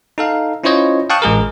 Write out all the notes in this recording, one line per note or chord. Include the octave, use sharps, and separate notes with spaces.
D#4 A4 F5
C#4 E4 F4 C5 C#5 D#5
F5 G5 A5 C#6 D#6 F#6
A1 G#3 G#4 A#4